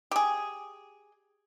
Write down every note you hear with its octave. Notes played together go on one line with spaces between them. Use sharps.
G4 G#4